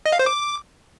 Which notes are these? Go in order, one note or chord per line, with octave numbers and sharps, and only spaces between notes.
D#5
F5
C5
D6